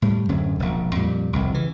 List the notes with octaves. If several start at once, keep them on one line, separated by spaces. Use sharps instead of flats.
A2 G3
D1 F#2 D3 C#4
E1 A#1
F2 A#2 G3
F1 C2
C#3 E3